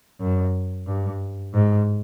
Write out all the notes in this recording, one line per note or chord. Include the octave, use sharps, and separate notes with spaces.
F#2
G2
G#2